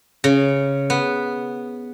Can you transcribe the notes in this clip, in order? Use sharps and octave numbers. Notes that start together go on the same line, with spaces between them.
C#3
B3